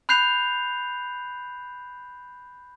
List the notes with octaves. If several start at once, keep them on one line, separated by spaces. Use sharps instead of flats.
B5 F#6 G6 C7 F7